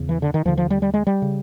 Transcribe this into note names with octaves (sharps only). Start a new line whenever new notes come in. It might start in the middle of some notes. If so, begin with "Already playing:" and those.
Already playing: E2 C#3
E3
D3
D#3
D#2 D3 F3
F3
G3
G3
G#3
G3
C#3